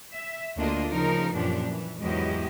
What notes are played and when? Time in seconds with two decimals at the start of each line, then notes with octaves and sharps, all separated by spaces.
0.14 E5
0.57 D2 A#3 D4 F4 D#5
0.91 C#3 F3 D#4 A#4
1.34 F#2 A#2 E3 F3 D4 G4
1.67 E3
2.00 E2 G#2 F#3 E4 G4 D#5